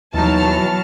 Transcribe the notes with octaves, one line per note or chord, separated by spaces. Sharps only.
D#2 B2 E3 F#3 D#4 A5 F6